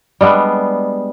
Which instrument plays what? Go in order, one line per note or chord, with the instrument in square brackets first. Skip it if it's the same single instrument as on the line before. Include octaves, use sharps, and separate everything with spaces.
[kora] G3 G#3 B3 D4